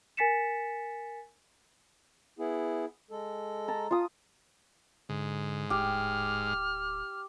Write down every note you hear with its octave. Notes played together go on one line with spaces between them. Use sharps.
A#4 G#5 A6 B6 C#7 E7
B3 E4 G#4
G#3 A4
A5 A#5
F4 D#6
G#2 D3
D1 G4 F6